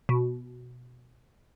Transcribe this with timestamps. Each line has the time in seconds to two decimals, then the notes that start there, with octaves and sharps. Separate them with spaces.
0.09 B2